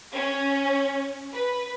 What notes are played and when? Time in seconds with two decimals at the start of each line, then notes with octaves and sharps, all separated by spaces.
0.13 C#4
1.34 B4